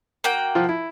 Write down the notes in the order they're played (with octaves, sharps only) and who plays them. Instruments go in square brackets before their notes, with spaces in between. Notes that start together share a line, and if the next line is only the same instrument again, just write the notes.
[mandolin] A#3 F#4 G5
[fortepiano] F3 F4
E4